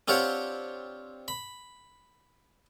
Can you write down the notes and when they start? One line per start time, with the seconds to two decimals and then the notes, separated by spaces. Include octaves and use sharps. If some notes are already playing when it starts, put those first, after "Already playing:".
0.08 C4 D4 F4 G4 C#5 F#5
1.28 B5